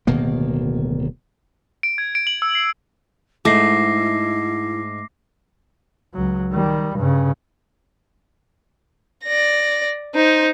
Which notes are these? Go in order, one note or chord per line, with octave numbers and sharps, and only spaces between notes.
D1 B2 D#3 A#3
D7
G#6
D7
F#7
E6
C7
G#2 A3 E4 D6 A#6 C7
C#2 F#3
D#3 G3
G2 C#3
D5 A#6
D#4 C5